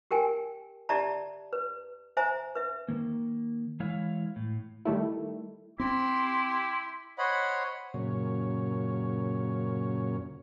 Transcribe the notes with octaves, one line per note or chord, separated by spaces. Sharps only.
G4 A#4 G5 G#5
G4 D5 E5 A5 A#5
B4
C5 E5 G#5 A#5
B4 E5
D#3 A#3
E3 G#3 E4 C#5 F5
A2
D#3 G3 A3 E4
C4 E4 G5 C6 D6
C5 C#5 D#5 F#5 B5
F#2 A#2 C#3 C#5